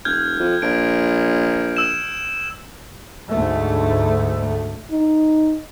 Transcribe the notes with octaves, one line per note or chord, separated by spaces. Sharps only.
E1 F6 G6 G#6
F2
A#1 D7
E6 E7
D2 G#2 A3
D#4